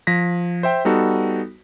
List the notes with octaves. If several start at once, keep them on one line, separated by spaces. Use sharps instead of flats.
F3 A#6 B6
C5 E5 G5
G3 B3 D#4 F#4 A4